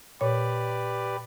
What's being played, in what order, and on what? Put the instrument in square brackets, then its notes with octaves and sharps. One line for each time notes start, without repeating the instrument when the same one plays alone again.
[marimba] A#2 C#5 [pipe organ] G4 B4 D5